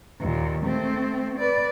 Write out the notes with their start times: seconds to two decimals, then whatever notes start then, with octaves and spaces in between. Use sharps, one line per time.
0.20 D#2 A#2
0.65 A3 C4
1.39 B4 D5